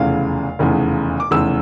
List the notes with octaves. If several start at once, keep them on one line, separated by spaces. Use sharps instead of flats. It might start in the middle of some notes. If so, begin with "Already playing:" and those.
Already playing: F1 E2 C#3 F5
F1 E2 C#3
D6
F1 E2 C#3 E6